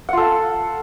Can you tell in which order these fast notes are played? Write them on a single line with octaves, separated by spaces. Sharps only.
F#5 F4 A4